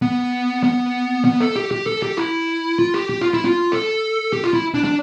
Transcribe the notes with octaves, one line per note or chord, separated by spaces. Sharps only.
B3
B3
B3
A4
G4
G4
A4
G4
E4
F4
G4
G4
F4
E4
F4
A4
G4
F4
E4
D4
D4